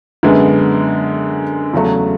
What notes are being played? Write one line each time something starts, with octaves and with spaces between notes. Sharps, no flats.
F#2 D3 G#3 B3
E2 C#3 F#3 A3